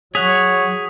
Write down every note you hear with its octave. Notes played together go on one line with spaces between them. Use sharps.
F#3 G#4 C#5 F#5 B6 F7